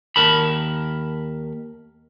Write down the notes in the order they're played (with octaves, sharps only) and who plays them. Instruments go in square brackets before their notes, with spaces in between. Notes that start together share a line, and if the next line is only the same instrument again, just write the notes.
[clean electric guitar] D#2 A#4 A5 B5